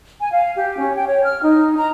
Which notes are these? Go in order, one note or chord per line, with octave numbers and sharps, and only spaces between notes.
G#5
F5
G4
C#4
G5
C#5
F6
D#4
A#5